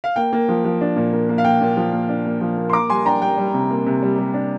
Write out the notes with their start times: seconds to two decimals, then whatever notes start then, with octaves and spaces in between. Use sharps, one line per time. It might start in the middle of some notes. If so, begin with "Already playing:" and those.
0.04 F5
0.16 A#3 G5
0.33 A#3
0.49 F3
0.65 F3
0.81 D4
0.96 A#2
1.13 A#3
1.29 A#3
1.38 F5
1.44 A#3 G5
1.61 A#2
1.77 F3
1.93 A#3
2.09 D4
2.26 A#3
2.41 F3
2.57 A#3
2.70 C6
2.73 A#3 A#5 D6
2.90 G3 G#5 C6
3.05 D4 G5 A#5
3.21 G3 G5
3.38 G3
3.54 C3
3.71 A#3
3.86 C3
4.02 G3
4.18 G3
4.34 D4